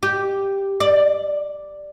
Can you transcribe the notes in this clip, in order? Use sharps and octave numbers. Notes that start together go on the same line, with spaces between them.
G4
D5